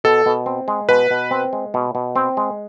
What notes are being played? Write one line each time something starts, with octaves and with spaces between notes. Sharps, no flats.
B2 A4
B2
C4
G#3
B2 B4
B2
C4
G#3
B2
B2
C4
G#3